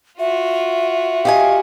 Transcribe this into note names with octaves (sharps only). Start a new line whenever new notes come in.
F4 F#4 E5
G4 D#5 F5 G#5